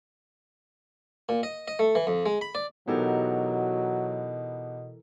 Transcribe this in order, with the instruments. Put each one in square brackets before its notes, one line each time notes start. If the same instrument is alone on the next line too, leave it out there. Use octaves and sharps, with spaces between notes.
[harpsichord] A#2
D#5
D#5
A3
E3
F2
G#3
B5
D5
[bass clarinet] B2 [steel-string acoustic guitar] E3 A4 A#4 [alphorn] F#3 [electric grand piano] B3 D#4 G4